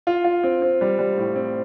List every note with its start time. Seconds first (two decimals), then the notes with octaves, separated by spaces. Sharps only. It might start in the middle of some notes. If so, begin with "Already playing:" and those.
0.07 F4
0.24 F4
0.43 C4
0.62 C4
0.81 G3
0.99 G3
1.17 A2
1.36 C4